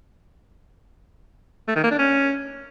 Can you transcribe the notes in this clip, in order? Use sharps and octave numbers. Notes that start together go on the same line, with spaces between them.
A3
D#3
A#3
D4
C#4